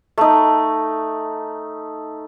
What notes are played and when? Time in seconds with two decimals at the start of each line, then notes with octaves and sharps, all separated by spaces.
0.18 A3 D#4